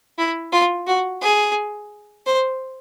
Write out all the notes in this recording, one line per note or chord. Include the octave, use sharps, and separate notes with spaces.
E4
F4
F#4
G#4
C5